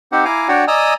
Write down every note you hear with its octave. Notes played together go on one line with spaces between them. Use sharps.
C4 D#4 G4 C5 F#5
E4 F5 G#5 A#5 D6
D4 F#4 C#5 D5 F#5 G5
D5 D#5 G#5 A#5 D#6 E6